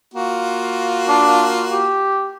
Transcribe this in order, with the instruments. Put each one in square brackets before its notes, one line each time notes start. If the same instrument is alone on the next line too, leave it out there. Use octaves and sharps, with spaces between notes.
[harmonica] A#3 F4 F#4
[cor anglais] D4
G4